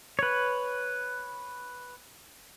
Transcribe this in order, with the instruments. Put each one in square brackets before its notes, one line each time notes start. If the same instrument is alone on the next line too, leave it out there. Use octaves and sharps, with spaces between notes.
[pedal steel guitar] B4 C#5